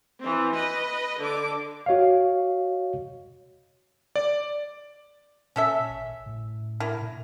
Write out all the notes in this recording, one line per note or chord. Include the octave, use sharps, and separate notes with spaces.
E3 C4
B4 D#5
D3 D6
F#4 C#5 D#5 F5
D5
A#2 C#4 A4 E5
G#1
A2
D3 E4 A#4
A#2